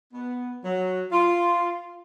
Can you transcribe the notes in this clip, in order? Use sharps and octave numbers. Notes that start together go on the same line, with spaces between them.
B3
F#3
F4